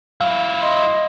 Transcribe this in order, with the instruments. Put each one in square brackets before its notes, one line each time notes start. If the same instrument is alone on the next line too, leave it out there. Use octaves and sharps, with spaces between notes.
[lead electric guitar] F#3 E4 [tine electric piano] F5
[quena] D#5 [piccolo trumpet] C6